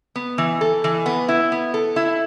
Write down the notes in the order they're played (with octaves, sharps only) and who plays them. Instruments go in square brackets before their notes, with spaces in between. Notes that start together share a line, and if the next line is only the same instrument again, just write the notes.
[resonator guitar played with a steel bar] B3
E3
A4
E3
B3
E4
B3
A4
E4